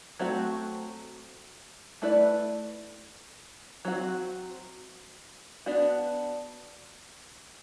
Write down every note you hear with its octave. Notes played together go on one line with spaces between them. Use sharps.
F#3 A3 C4 F#4
A3 E4 B4 D5
F#3 C4 F#4
B3 D4 F#4